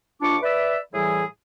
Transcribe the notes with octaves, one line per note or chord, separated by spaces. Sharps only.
D#2 D4 F4 C#6 D6
B4 D5 E5
A2 E3 G3 E4 G#4